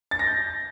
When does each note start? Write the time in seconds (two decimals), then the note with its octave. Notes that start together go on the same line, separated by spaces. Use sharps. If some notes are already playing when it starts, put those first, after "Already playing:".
0.11 A6
0.19 A#6
0.27 G6